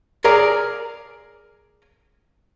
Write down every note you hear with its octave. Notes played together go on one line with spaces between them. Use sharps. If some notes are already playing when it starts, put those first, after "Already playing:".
G#4 A#4 D5 A#5